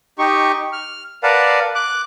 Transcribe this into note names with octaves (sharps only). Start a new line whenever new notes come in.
D#4 G4 C#6
F6
A#4 B4 D5 F5 F#5 A5
D6 F#6